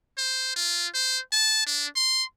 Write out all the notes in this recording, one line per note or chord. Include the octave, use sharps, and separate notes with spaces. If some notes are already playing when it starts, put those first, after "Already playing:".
C5
F4
C5
A5
D4
C6